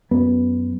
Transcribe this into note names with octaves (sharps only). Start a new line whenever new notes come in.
F#2 B3